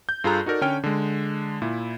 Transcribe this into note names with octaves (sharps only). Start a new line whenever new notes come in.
G6
G2 F4 G#4 A4 A#5 F#6
D#4 F#4 A4 A#4 D5
D3 C#4 C#5 G5 F6
D3 G#3
A#2 E4